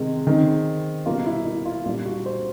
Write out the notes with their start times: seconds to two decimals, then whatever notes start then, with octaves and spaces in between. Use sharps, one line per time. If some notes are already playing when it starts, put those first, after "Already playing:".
Already playing: C3 D#3 G#3
0.27 D#3 G#3 C4
1.06 B2 G3 A#3 F4
1.26 E4
1.45 E4
1.65 F4
1.86 A#2 G3 A#3 D4 F4
2.06 F#4
2.26 C5